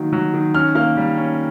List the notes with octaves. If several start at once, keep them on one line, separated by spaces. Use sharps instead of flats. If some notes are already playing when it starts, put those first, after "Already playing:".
Already playing: D#3 F#3 A#3
F#3
D#3
C#4 F6
A#3 F6
G3
C#4